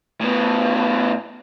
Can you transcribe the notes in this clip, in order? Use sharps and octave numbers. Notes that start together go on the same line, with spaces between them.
A2 B3